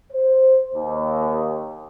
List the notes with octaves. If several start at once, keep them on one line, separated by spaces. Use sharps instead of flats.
C5
D#2